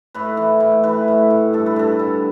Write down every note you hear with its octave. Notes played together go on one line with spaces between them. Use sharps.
A2 B4
E3
A2
E3 B4
A2
A2
G2 A4
B4
G2 A4
D3